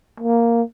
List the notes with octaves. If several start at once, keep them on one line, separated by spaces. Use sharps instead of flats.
A#3